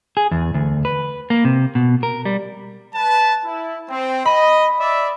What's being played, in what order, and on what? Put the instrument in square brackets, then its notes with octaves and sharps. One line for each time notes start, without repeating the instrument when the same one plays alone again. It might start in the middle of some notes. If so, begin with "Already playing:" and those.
[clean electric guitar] G#4
E2
D2
B4
A#3
C3
B2
A#4
G3
[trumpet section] B4 A5
E4
C4
[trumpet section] D#5 [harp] B5
[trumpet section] D5 E5